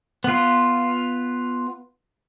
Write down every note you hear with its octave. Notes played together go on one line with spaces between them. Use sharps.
B3 F4